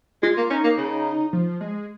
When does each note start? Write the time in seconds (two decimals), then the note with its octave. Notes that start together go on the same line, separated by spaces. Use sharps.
0.23 G#3 F4
0.37 A#3
0.50 C#4 D#4
0.64 A#3
0.78 C#3
1.33 F3
1.61 G#3